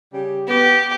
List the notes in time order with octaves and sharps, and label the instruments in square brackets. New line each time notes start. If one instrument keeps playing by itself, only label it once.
[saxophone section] C#3 G3 G4
[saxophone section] B3 [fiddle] G4